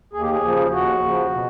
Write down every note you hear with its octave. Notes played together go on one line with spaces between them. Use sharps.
D#2 G#4
G4
G#4
C#3 F3
D#2 F#4
C#3 F3
B2